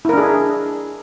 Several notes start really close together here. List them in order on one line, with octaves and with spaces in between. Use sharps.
E4 A#4 D4 G#4